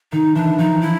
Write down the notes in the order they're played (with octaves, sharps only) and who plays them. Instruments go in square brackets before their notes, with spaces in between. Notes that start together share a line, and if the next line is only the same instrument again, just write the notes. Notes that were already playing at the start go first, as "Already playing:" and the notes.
[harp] D#3 [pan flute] D#4
[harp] E3 [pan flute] D4
[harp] F3 [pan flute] D#4
[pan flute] E4